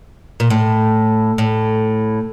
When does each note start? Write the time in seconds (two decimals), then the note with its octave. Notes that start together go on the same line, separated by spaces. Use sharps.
0.40 A#2
0.50 A2
1.38 A2